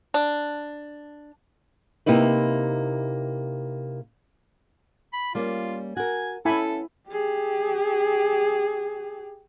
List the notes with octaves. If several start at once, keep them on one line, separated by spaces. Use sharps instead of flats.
D4
C3 A#3 D#4 E4 B4
B5
G3 A#3 C#4 F4
F#4 A#4 G#5
B3 C#4 E4 A4 G#5 B5
G4 G#4